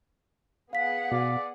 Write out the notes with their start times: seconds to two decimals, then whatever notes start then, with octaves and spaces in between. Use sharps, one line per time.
0.73 B3 G#4 F5 F#5 B6
1.12 B2 D5